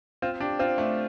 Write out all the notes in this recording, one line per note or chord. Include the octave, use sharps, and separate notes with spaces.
C4 F4
D4 G4
C4 F4
A3 D4